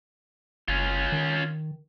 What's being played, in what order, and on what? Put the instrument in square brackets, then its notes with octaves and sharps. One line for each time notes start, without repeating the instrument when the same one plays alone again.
[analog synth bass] F#1 [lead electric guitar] C#4 F4
[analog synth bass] D#3